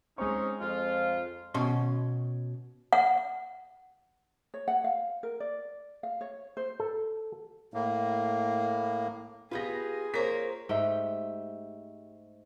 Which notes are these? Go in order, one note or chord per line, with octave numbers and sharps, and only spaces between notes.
G#3 C4 C#4 D#4 C#6
F2 F4
B2 C#4 C6
F#5
C#5
F#5
F5
A#4
D5
F5
C#5
C5
A4
A2 A#3
B3 F4 G4 G#4 B4 A#6
A#3 A#4 C5 C#5 B6
G#2 A3 G4 G5